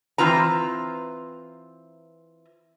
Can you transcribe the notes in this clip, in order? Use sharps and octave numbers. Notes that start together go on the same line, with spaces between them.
E3 C4 F4 B4 A#5